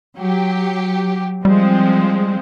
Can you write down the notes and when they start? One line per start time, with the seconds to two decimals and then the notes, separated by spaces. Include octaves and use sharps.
0.18 F#3 G4
1.45 F3 G3 G#3 C4